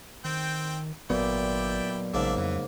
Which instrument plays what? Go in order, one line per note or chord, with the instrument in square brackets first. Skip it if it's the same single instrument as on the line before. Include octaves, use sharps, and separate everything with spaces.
[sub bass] D#3 [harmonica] C4 G5
[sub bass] G#1 [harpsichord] A#2 [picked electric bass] F#3 B3 [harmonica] E4 D5 G5
[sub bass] A#1 [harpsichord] G#2 C#3 A#3 [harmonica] D4 E5
[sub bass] F2 [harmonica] E3